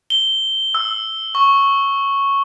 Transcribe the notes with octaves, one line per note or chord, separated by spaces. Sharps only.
G7
E6
C#6